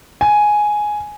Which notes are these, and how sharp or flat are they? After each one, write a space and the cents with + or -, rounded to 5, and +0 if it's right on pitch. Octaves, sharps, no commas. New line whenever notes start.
G#5 +5